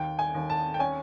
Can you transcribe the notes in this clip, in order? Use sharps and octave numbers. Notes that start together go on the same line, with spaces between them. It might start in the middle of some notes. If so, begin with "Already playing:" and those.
Already playing: D#2 G5
G#5
D#2
A5
G5
C#4 G#5